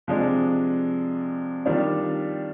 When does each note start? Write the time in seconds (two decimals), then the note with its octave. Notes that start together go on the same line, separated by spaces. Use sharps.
0.07 C3 F3 G#3 D4
1.65 D#3 G3 D4 F4